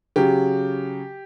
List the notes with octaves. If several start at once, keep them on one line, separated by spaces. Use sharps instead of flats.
C#3 F#3 G4